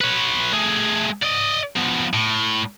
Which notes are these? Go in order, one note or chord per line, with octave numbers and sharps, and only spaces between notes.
B4 C#5
A3 G#4
D5 D#5
F3 B3
A2